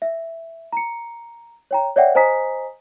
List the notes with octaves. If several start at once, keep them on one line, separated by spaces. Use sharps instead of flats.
E5
A#5 C#7
C#5 G5 A#5
C#5 D5 E5 F#5 G5
C5 D#5 G#5 A#5 D#6 B6